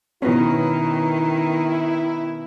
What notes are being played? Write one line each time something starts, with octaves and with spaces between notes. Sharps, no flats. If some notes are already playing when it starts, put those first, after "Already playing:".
B2 D#3 B3 C#4 E4